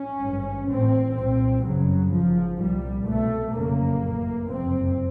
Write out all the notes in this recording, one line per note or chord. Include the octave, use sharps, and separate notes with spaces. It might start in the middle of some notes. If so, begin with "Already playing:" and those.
Already playing: C#4
G#1 G2
A1 A2 C4
C2 A#2 C4
G1 F#2 C#3 F#3
G#1 G#2 F3
C2 A#2 G3
C2 B2 A3
F#1 F2 C#3 A#3
A1 A2
F#1 F2 C3 C4